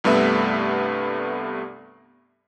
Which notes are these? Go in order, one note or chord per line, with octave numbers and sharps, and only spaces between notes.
C2 G2 A3 B3 E5